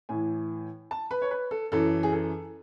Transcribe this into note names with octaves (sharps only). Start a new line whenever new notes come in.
A2 E3 G#5
A5
B4
C#5
B4
A4
F#2 E3 A4
G#4
A4